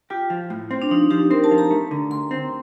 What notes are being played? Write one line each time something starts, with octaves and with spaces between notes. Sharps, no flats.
F4 G4
F3
A2
C4
D4
F3 D#4
F3 G4
C4 A#4
A5
F3
A#5
A3
D3
D2 C6
C4